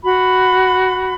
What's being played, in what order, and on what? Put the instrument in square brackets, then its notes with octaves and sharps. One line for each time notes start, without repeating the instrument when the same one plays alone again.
[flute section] F#4 B5